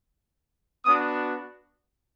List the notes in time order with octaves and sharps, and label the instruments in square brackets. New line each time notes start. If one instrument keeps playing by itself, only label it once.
[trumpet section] B3 D4 F#4 D#6